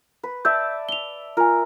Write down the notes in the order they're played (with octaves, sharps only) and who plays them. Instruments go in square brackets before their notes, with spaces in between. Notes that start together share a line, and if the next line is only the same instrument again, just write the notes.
[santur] B4
[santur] D5 E5 A5 [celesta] E6 G6
[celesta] F7 G7
[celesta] F4 G#5 [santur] A#4